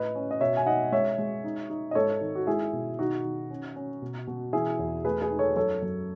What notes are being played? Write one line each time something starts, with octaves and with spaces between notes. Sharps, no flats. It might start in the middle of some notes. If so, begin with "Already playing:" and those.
Already playing: A2 B4 D#5
C#4
D#5
B2 C#5 E5
G#5
D#4 D#5 F#5
G#3 C#5 E5
G#3
D#4
D#4
D#5
G#2 A4 C#5
D#3
F#4
G#3 E4 G#4
B2
D#3 D#4 F#4
D#3
C#4
C#4
B2
B2
E3 E4 G#4
E2
A3 G#4 B4
G#4 B4
D#4
A4 C#5
F#2 A4 C#5
F#2